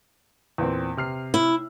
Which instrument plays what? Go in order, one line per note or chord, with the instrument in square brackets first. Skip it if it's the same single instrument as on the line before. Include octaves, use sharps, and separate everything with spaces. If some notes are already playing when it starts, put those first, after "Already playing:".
[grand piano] E2 A#2 C4
C3 F6 C7
[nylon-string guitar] E4